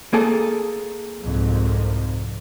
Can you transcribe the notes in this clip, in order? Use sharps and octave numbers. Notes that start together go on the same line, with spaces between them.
A#3 G#4 A4
C2 F2 G#2